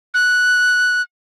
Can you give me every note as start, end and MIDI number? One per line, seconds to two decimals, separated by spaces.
0.14 1.02 90